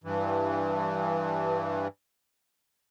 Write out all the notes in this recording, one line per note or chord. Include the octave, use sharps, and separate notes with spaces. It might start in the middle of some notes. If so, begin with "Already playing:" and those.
G2 E3